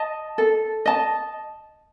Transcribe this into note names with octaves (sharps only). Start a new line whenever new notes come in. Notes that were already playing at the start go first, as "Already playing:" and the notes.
Already playing: D#5 A5
A4
D#5 A5